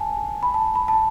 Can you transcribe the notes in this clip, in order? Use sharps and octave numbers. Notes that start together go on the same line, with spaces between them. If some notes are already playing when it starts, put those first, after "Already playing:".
Already playing: G#5 A5
B5
A5
B5
A5